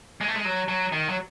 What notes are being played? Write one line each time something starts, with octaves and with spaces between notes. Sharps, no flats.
G#3
A3
G#3
F#3
F#3
D#3
F#3